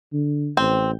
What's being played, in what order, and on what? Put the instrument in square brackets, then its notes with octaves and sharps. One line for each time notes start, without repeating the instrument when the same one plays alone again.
[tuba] D3
[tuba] A1 [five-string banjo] C4